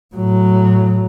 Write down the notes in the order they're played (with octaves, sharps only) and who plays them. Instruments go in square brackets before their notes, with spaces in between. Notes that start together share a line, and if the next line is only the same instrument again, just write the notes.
[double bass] A2 F#3